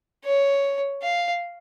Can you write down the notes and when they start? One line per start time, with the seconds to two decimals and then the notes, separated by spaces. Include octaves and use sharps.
0.24 C#5
1.03 F5